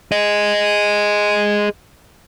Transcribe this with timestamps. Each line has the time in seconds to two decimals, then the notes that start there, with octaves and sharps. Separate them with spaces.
0.12 G#4 D#5